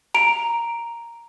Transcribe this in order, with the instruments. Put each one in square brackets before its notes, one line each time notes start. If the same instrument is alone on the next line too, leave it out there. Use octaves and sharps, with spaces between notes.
[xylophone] A#5 D7